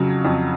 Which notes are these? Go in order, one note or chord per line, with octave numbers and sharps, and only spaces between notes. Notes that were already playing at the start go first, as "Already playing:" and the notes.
Already playing: F2 C#3 F#3
F2